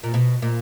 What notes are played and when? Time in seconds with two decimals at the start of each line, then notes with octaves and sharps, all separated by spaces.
0.03 A#2
0.14 B2
0.42 A#2